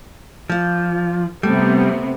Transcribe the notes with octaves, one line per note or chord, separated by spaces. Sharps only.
F3 F4 D5
C3 G3 A3 B3